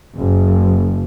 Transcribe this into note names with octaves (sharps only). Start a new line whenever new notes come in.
F#1